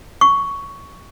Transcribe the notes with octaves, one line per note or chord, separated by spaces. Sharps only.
C#6